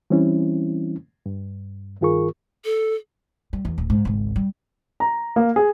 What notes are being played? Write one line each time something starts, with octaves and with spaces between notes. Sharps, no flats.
E3 G3 C4 C#4 E4
G2
G2 D#3 F4 G#4 A#4 C#6
A4
G3
E2
D1
G#2 C#3
G#1 C#2
G3
A#5
A#3
G#4